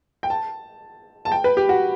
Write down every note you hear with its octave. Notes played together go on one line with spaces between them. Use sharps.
G5
A5
A5
G5
B4
G4
F#4